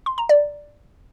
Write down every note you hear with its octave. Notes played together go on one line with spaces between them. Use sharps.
C6
A#5
D5